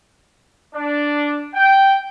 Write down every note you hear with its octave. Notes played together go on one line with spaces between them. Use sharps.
D4
G5